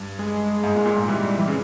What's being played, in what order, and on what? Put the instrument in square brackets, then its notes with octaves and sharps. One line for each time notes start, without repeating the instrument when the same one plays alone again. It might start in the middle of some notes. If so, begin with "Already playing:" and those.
Already playing: [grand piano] G2
[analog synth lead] G#3
[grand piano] G#2
A#2
A#2
G#2
[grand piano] E3 [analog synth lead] G3
[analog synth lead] G3
E3
[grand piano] C#3